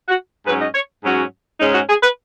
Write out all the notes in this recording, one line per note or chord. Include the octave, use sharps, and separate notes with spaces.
F#4
G#2 F#3 C#4 B4
D#5
C#5
G#2 F#3 C#4 F#4
G#2 G#3 C#4 D#4
F#4
G#4
B4